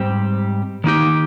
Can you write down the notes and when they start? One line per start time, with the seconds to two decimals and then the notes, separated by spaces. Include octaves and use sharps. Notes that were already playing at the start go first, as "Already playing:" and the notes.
Already playing: G#2 G3 C4 G4
0.84 D#3 A#3 D#4 G4